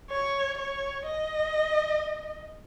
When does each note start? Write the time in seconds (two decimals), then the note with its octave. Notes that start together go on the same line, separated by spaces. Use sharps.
0.11 C#5
0.58 C#5
1.07 D#5